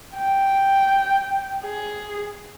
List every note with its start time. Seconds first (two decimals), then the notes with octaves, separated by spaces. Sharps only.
0.16 G5
1.64 G#4